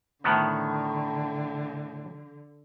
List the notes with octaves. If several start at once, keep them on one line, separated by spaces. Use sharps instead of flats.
A2 D3 D#3 B3